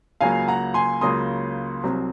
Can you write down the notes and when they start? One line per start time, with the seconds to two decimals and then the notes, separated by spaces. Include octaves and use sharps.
0.21 C#2 C#3 F#3 A#3 F5 G#5
0.48 F#5 A#5
0.74 G#5 C6
1.01 C#2 C#3 F#3 A#3 C6 D#6
1.83 C2 C3 F#3 C4